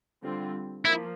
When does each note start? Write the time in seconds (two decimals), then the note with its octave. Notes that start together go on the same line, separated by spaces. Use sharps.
0.23 D3 G3 C4 F4
0.85 F3 A#3 E4